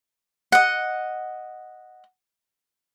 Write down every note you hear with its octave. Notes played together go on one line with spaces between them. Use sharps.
D#5 F#5